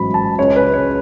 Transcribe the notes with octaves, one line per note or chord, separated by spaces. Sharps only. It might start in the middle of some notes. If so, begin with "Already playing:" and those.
Already playing: A1 G#2 F#3 B5
A5
C#2 C#3 G#3 C#5
B4
C#5